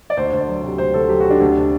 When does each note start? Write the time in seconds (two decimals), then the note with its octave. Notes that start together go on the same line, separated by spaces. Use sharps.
0.10 D5
0.17 D2 C5
0.33 D2
0.48 F#3
0.63 C3
0.78 D2 C5
0.94 D2 A4
1.09 F#3 G4
1.20 F#4
1.26 C3 D4
1.40 D2